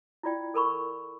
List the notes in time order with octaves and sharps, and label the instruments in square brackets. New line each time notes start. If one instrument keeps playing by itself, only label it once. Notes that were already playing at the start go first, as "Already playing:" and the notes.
[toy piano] E4 F4 D5 G5
A4 A#4 B5 C#6